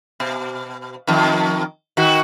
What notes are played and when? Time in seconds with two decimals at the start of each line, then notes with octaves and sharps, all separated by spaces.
0.20 B2
1.07 F2 D#3
1.97 D#3 F#4